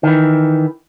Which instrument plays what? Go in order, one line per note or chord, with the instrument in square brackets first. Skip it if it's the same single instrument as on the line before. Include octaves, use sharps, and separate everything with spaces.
[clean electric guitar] D#3 E3